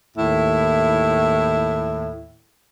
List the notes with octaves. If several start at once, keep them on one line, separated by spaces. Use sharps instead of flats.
D#2 A2 E4